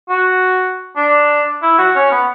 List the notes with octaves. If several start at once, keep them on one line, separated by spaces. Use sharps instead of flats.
F#4
D4
E4
F#4
C#4
B3